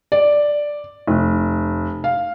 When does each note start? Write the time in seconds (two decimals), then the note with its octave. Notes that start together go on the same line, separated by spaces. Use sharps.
0.12 D5
1.07 F1
2.04 F5